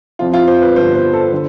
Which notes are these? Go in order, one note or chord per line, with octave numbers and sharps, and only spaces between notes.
F2 C3 F3 F4
F4
C5
B4
G1 G2 F3 B3 C5
C5
A4
D3 C5